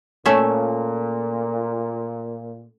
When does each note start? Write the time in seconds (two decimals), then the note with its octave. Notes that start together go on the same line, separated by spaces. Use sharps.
0.26 A#2 A3 C#4 E5